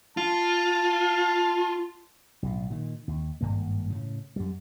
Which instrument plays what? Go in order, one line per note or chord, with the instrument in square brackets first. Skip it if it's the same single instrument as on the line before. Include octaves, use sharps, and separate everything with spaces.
[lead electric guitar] F4 [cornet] A5
[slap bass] B1 A2
A#2 D#3
D#2
G#1 G2 A#3
A2 C#3
F#2 G3